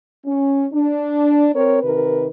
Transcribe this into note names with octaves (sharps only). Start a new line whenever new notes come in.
C#4
D4
C4 A#4 C#5
C3 D#3 A#4 B4